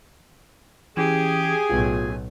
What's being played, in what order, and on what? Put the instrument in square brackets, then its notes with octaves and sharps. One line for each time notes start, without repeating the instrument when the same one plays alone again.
[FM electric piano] E3 C#4 [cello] G4 [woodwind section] G#4 G#5
[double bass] B1 A2 [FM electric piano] F4